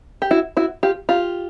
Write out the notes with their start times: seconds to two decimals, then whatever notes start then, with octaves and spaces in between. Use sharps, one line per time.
0.22 G4
0.31 E4 F#4
0.57 E4 F#4
0.83 F4 G4
1.09 F4 G4